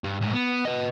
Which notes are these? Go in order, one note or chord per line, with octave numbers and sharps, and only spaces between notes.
G2
A2 G#3
B3
B4 D#5